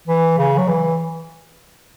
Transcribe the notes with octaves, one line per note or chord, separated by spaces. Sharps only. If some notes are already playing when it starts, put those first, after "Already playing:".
E3
C#3
F#3
E3